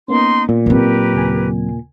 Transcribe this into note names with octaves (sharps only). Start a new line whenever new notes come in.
A#3 B3 C#4 D#4 C6
A#2
F#3 C4 G4 A#4 B4
D#2 C#3 G#5